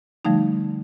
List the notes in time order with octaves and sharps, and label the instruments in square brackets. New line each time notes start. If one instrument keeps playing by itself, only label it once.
[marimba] D3 F3 G3 A3 D#4